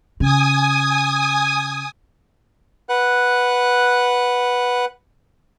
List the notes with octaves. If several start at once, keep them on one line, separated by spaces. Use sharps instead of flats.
C#3 G#5 D#6
B4 F#5 F#6